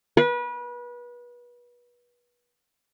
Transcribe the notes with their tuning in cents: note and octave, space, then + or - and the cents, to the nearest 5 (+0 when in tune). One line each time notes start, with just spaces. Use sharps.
B4 -30